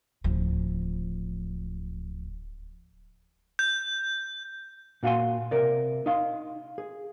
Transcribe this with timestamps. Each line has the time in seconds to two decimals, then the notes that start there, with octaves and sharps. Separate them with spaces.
0.24 D1 F3
3.59 G6
5.03 A#2 F#4 F5 F#5 G#5 C6
5.51 C3 A#4 D5
6.06 D#4 F5 C6
6.78 G#4